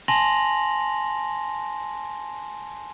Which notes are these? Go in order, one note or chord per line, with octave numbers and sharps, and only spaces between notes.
G#5 A5 C6 A#6 F7 F#7